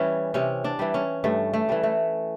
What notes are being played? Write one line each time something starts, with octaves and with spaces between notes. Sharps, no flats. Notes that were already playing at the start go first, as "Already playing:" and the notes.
Already playing: E3 G3 C#4
C3 C#4
D4
E3 G3
C#4
G2 A3
A3
E3 G3
A3